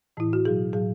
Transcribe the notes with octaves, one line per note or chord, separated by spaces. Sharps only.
A2 E3 E4
F#4
B2 F#3 G#4
A2 F#3 G#4